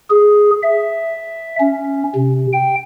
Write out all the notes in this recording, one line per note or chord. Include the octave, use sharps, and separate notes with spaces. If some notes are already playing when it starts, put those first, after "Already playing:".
G#4
E5
C#4
C3
G5